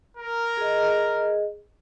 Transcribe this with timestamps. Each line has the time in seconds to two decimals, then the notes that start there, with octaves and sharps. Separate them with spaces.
0.17 A#4
0.57 G#4 D#5